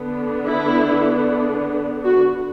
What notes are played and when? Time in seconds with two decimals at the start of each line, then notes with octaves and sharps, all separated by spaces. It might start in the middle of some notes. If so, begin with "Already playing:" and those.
Already playing: D3 B3 D4
0.48 E4
2.04 F#4